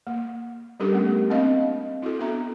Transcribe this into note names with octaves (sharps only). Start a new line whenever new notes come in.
A#3
G3 C#4 D4 G4 A4 A#4
G#3 A3 B3
A#3 C4 D4 A#4 D#5 F5
E4 F#4 A4
B3 D4 A4 E5 A#5